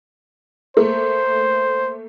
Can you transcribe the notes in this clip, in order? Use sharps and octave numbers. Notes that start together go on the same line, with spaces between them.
A3 A#3 C5